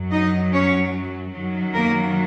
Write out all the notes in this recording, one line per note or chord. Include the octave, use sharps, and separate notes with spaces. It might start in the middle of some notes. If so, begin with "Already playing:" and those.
Already playing: F#2 F#3
D#4 D#5
C#4 C#5
F#2 D#3 F#3
A#3 A#4